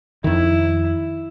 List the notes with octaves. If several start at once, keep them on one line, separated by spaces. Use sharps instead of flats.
F2 D#3 E4